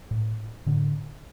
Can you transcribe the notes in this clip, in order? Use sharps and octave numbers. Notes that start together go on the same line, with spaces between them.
A2
A2 D3